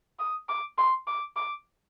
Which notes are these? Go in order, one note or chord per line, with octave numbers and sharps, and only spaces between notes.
D#6
D6
C6
D6
D6